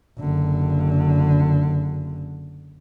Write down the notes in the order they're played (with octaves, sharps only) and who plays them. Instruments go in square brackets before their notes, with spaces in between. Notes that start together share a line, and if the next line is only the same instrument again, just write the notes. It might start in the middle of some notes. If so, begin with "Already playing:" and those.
[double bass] F#1 D3